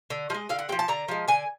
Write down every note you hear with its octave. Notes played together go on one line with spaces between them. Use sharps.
D3
F3 G#3 D#5
D3 F5
F#5
F3 G#3 G5
A5
D3 A#5
F3 G#3
D3 G#5